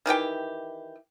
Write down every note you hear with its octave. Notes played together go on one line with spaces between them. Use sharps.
D#3 E3 G4 G5